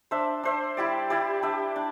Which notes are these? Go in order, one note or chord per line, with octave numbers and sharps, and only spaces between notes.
D4 C5 E5
D4 C5 E5
G3 E4 G4 D5
G3 E4 G4 D5
D4 G4 E5
D4